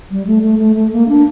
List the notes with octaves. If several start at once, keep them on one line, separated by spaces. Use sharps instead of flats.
G3
A3
A3
A3
A3
A#3
D4